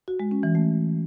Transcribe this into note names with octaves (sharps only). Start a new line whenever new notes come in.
F#4
G#3
C#4
E3
A3